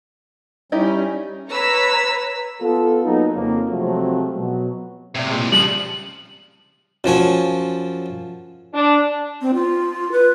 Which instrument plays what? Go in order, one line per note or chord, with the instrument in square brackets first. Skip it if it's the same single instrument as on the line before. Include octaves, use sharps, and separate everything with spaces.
[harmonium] G3 C#4 [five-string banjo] D#4 E4 G4
[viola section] B4 C#5 A#5 [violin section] E6 B6
[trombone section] B3 F4 A4
F#3 A#3 B3 D#4
F2 C#3 A#3
C3 F3 F#3 G#3 A3 C4
B2 F#3
[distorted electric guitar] A2 C3 [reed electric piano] D5 G#6
[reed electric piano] A#2 G#3
[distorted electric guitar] C#3 F3 [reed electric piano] G3 A5 F#6 [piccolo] F#7
[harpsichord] F#2 F3 C#5 G#5
[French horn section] D4
[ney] C4
F4
B4